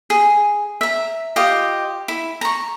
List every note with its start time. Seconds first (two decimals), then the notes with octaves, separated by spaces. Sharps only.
0.10 G#4
0.81 E5 A#5
1.36 F4 G4 D#5
2.08 E4
2.41 A#5 C#6